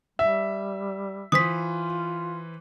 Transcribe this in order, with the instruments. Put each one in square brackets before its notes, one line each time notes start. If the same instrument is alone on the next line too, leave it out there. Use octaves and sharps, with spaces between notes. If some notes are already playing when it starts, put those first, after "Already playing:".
[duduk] G3 [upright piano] E5
[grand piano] E3 B4 C5 [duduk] F4 [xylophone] D#6 B6